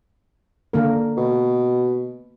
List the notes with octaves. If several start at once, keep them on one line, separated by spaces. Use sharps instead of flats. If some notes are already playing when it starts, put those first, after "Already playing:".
D3 A#3 A#4
B2